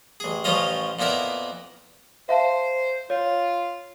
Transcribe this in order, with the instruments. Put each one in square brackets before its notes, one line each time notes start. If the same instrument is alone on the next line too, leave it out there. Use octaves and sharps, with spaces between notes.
[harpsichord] A1 G#4
A1 F3 C#4 F4 D#5 F5
F2 A#2 B3 E4 A#4
[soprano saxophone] C5 [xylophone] E5 F5 A5
[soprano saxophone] F4 [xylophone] C#5